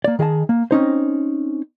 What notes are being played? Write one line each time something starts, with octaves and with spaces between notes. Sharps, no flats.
A#3 D5
D#3 G#4 D#5 F5 A5
A#3
C4 C#4 D#4 C5